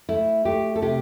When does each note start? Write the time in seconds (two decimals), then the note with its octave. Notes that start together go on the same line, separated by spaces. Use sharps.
0.09 A3 E4
0.45 A3 G4
0.76 A4
0.82 C3 G4